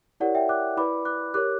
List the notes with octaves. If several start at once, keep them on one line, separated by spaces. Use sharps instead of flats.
E4 G4 A#4 C#5 D5 F#5
E5 G5
D6 F#6
E4 B4 D5 B5 D6
D6 F#6
G4 A#4 C#5 D6 F#6